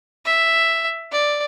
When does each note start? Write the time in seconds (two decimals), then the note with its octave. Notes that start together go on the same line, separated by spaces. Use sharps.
0.25 E5
1.12 D5